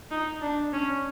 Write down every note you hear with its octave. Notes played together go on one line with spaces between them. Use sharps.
D#4
D4
C#4